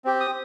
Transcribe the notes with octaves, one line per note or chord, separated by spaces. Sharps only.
C4 G4
D#6